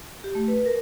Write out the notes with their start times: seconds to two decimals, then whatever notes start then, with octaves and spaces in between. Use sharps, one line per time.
0.24 G4
0.35 A3
0.48 B4
0.66 A#4